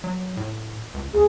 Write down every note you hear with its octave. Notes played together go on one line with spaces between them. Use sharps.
F#3
A2
C#2
D2 G#4